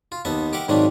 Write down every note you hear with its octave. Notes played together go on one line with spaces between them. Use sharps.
F4
D#2 B3 D#4 E5 A5
G4 A#4 E5 F#5 D6
G#2 D#3 F#3 A#3 C4 D4